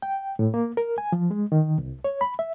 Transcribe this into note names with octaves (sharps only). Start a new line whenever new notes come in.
G5
A2
A#3
A#4
G#5
F3
G#3
D#3
C2
C#5
B5
E5